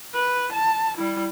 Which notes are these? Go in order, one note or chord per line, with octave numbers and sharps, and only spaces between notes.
B4
A5
G3 E4